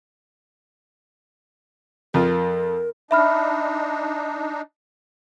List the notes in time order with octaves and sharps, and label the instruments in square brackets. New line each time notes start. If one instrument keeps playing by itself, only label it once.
[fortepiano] F2 F4 [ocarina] A#4
[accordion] D4 D#4 [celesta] E5 B5 F6